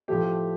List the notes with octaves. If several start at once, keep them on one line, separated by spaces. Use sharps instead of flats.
A2 F3 A3 G4